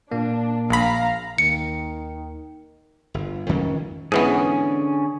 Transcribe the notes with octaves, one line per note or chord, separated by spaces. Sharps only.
A#2 A#3 D4
A#1 F5 A#5 B5
D#2 D#3 C#7
G1
F2 D#3 C#4
G#2 D3 E3 B3 C#4 G#4